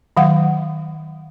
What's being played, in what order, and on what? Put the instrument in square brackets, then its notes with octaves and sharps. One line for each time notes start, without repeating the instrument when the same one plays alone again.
[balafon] D#3 F#3 F5 F#5